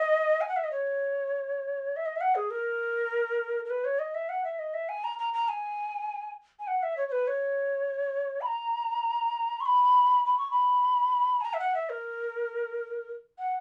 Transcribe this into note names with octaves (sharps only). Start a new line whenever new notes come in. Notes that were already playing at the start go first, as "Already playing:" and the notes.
Already playing: D#5
G#5
F#5
E5
D#5
C#5
E5
D#5
E5
F#5
G#4
A#4
A#4
B4
C#5
D#5
E5
F#5
E5
D#5
E5
G#5
A#5
A#5
A#5
G#5
G#5
F#5
E5
C#5
C#5
B4
C#5
B5
A#5
C#6
B5
B5
C#6
B5
G#5
A#5
E5
F#5
E5
A#4
F#5